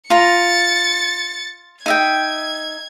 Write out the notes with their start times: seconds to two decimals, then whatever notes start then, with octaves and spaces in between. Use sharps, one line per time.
0.10 F4 A#5 A6 C#7
1.86 D#4 E5 G5 G#6